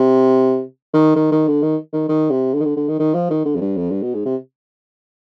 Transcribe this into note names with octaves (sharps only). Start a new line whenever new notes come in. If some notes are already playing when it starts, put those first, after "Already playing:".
Already playing: C3
D#3
D#3
D#3
D3
D#3
D#3
D#3
C3
D3
D#3
D3
D3
D#3
D#3
F3
D#3
D3
F2
G2
F2
G2
B2
G#2
C3